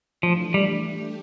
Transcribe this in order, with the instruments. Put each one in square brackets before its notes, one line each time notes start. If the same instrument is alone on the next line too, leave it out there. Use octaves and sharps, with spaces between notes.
[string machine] E3 A3 D4 [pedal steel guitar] F3
[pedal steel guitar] G3
[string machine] A3 D4 G4